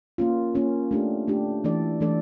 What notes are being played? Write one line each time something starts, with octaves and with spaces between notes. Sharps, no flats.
A#3 C#4 F4
A#3 C#4 F4
A3 D4 G4
A3 D4 G4
E3 A3 D4 A4 D5
E3 A3 D4 A4 D5